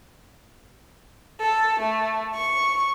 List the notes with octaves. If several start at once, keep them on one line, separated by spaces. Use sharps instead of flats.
A4
A3
C#6